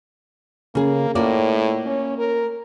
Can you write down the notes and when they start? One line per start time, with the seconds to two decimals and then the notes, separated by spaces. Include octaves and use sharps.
0.75 C#3 A#3 G#4
1.15 A2 A#3 F4 D5
1.86 C#4
2.19 A#4